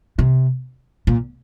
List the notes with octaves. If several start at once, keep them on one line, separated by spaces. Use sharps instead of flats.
C3
A#2